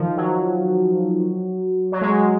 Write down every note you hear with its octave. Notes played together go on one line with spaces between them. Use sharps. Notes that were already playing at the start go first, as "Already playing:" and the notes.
Already playing: D#3 F3
F#3
F#3
G#3